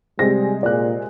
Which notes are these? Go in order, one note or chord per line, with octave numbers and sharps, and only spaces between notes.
C3 G3 G#3 C4 A#6
A#2 D5 F#6